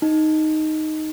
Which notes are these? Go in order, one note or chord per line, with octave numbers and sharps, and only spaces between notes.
D#4